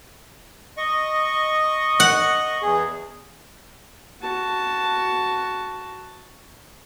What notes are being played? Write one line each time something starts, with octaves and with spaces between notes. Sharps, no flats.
D#5 C#6
F#5
E2 G#4
F#4 A5